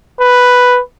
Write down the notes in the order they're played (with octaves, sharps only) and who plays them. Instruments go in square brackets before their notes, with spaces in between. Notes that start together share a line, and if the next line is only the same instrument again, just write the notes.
[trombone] B4